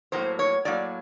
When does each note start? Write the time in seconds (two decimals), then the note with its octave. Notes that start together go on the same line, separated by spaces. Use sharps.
0.12 A2 F#3 A#3 C5
0.39 C#5
0.65 A2 F#3 A#3 D5